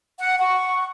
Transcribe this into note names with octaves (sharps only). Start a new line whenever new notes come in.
F#5
F#5 C#6